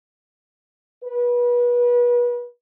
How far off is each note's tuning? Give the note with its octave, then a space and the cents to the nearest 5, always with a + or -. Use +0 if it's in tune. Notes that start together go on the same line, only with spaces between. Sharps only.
B4 -30